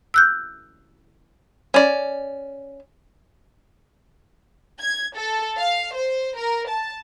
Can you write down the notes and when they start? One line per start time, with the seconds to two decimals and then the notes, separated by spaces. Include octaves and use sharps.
0.14 E6 F#6 G6
1.74 C#4 D5
4.81 G#6
5.16 A4
5.58 F5
5.95 C5
6.37 A#4
6.69 A5